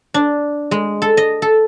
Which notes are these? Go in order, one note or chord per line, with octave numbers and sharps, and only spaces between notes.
D4
G#3
A4
D#5
A4